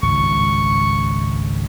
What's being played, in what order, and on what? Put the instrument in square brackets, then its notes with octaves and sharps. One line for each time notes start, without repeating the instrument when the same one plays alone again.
[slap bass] G#1 C#2 G2 [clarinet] C#6